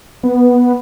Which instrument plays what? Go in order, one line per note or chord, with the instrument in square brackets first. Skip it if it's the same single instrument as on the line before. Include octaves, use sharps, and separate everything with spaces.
[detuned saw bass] B3